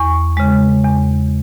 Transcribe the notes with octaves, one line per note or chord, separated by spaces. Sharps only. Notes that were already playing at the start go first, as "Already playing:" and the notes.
Already playing: E2 C#6
C#3 G#3
E2